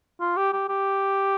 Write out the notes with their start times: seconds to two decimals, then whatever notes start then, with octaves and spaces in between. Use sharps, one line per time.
0.20 F4
0.37 G4
0.53 G4
0.69 G4